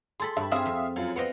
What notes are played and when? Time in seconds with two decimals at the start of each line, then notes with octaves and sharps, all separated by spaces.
0.20 G#4 A4 B5 C6 A6
0.37 G2 E5 B5
0.52 C4 G#4 E5 F5 D#6
0.66 F2
0.96 F#2 F4
1.16 B3 C4 D#5 F5 F#5